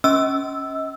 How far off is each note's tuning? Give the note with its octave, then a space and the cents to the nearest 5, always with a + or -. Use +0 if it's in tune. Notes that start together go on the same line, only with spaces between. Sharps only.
C#4 +0 D#5 +35 E6 +0